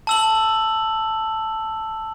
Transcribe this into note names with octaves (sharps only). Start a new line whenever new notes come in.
A5 E6 F#7